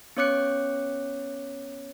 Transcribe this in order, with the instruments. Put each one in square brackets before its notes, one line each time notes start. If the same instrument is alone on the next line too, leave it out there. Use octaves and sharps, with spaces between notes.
[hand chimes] B3 C#4 C#5 D6 F#6 C#7